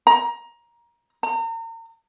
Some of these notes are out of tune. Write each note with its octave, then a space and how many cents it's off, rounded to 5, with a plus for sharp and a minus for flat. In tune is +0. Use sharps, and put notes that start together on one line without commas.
A#5 +20
A#5 -40